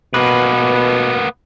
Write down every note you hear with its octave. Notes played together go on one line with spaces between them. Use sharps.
B2 A#3 B3 B4